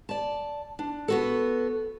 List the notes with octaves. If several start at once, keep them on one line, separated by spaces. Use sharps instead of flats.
D5 A5
D4
B3 F#4 A4